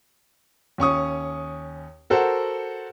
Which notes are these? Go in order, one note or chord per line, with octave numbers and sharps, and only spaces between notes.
D#2 C#4 C#6 D#6
F#4 A4 A#4 C5 F#5